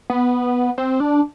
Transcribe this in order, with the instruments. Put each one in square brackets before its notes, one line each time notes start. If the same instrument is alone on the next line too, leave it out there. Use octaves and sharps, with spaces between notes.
[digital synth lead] B3
C4
D4